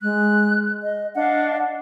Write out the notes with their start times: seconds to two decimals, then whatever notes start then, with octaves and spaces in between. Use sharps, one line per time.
0.02 G#3 F#6
0.83 D#5
1.16 D4 D#5 F5 F#5